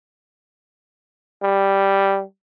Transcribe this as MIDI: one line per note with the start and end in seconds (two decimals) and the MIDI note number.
1.43 2.23 55